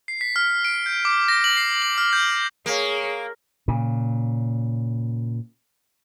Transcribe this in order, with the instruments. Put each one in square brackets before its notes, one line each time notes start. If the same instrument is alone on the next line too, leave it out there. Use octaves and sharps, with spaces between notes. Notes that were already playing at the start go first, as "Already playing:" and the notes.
[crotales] C7
B6
F6
D7
G6
D6
A#6
F#7
C7
F#7
F6
G6
[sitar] A#3 [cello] G#4 C#5
[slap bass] A#2 C#3